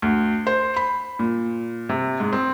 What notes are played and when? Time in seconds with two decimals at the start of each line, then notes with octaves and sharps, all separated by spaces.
0.02 D2
0.47 C5
0.76 B5
1.19 A#2
1.89 C3
2.20 G#2
2.33 C4